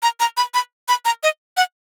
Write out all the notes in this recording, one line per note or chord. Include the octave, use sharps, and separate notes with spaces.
A#5
A#5
B5
B5
B5
A#5
D#5
F#5